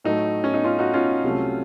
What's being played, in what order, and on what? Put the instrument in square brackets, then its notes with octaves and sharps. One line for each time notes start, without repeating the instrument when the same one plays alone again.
[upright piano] A2 F#3 A3 D#4
C#4
D#4
C#4 F4
D#4 F#4
C#4 F4
C2 C3 F#3 A3